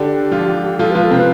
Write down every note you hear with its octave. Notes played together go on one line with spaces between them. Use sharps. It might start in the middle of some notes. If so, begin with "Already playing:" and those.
Already playing: D3 D4 G4
F3 F4
F3 F4 A4
F3 F4 B4
A4
C3 C4 B4